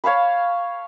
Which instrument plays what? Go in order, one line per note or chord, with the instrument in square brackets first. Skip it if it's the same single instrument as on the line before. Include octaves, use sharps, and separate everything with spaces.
[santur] C#5 F5 A5 B5